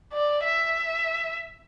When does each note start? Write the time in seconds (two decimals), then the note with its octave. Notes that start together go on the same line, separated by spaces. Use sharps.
0.14 D5
0.44 E5